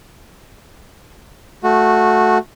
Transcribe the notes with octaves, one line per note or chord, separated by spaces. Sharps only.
A3 F#4